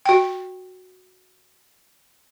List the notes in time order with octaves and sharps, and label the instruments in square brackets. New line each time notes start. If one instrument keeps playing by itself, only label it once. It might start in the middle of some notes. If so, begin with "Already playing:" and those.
[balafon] F#4 G5